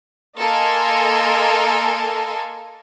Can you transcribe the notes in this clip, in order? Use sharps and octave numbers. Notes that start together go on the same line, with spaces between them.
A#3 A4 A#4 D#5 G#5 C6